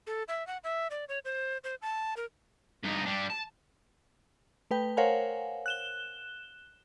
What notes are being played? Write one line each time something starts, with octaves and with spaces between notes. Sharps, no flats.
A4
E5
F#5
E5
D5
C#5
C5
C5
A5
A#4
G2 D#4
G3 D4
A5
A3 B4 G5
A#4 C5 C#5 F5 F#5 G#5
F#6 E7 G7